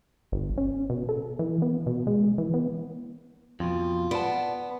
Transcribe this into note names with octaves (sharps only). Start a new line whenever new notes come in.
G1
C#4
B2
A4
E3
B3
B2
G#3
E3
B3
F2 B2 F4
B3 D5 A5